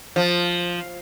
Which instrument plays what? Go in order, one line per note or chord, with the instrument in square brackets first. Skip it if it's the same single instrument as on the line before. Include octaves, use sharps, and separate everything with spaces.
[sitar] F3